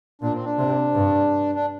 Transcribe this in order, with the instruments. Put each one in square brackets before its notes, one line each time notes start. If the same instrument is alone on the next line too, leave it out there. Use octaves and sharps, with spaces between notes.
[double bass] A#2 [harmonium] D4
[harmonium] C4
D4
[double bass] C3
G2
[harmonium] D4